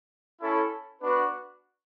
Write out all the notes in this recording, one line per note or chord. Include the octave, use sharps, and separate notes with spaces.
C#4 E4 A4
B3 D4 F#4 B4